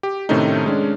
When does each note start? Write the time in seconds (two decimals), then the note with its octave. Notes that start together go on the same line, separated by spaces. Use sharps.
0.03 G4
0.29 A2 C3 D#3 A3 C#4 D#4
0.66 G#3 C#4 D4